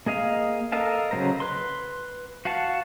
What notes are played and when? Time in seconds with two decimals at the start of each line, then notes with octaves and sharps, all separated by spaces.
0.06 A#3 G#4 D#5 F5
0.72 A4 A#4 D#5 F5 A5
1.11 C#3 F#3 A3 C5 A#5
1.40 B4 C6
2.45 F#4 F5 F#5 A5